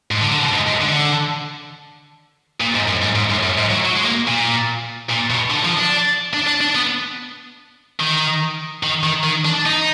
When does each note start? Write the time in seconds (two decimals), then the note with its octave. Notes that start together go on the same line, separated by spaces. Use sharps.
0.11 G#2
0.22 D3
0.32 D3
0.43 B2
0.53 G#2
0.67 G#2
0.81 D3
2.61 A#2
2.75 G#2
2.87 F#2
3.02 G#2
3.15 G#2
3.30 F#2
3.43 F#2
3.58 G#2
3.71 F#3
3.85 F#3
3.95 G#3
4.05 A#3
4.27 A#2
5.10 A#2
5.30 B2
5.50 D3
5.65 F3
5.79 D4
6.34 D4
6.47 D4
6.61 D4
6.75 B3
8.00 D#3
8.83 D#3
9.04 D#3
9.24 D#3
9.45 D4
9.66 D#4